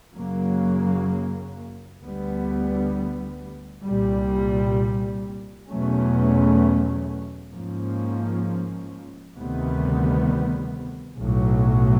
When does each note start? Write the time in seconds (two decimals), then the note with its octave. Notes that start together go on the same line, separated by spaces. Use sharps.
0.16 F#2 C#3 F#3 A#3
2.01 D2 D3 G3 B3
3.84 C2 A#2 G3
5.69 E2 B2 F#3 A3 C#4
7.52 G#2 F3 A#3 C#4
9.36 D2 C3 D#3 G3 B3
11.21 B1 A2 F#3